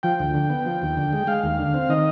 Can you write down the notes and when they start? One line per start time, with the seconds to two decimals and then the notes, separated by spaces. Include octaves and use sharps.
0.03 F3 G5
0.20 D2
0.34 D3
0.50 B3
0.66 F3
0.82 D#2
0.97 D3
1.13 G#3
1.27 G#3 F5
1.44 D#2
1.58 D3
1.74 C4
1.89 D#3 D#5